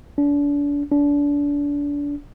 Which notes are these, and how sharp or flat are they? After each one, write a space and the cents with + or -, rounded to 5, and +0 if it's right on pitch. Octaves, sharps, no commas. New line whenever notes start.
D4 -35
D4 -30